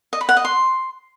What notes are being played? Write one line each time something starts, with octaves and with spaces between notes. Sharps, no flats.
D#5
B5
F#5
D#5
C6